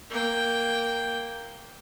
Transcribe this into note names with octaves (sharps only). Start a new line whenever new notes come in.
A#3 G5